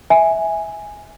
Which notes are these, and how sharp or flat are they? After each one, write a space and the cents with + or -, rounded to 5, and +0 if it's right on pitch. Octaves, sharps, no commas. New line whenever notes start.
E5 -15 G#5 +0